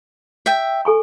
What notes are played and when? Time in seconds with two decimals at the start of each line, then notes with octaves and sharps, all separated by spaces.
0.46 E5 G5
0.85 A4 G#5 C#6